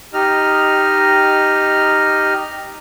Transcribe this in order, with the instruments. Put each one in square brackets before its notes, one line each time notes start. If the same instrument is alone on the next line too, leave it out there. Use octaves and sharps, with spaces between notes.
[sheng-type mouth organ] D#4 G4 D#5 F6